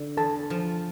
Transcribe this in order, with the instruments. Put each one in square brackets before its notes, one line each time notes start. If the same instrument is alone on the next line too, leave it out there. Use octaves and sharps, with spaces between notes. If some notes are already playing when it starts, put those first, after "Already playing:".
Already playing: [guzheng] D3
[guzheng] E2 [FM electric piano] A4 A5
[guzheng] F3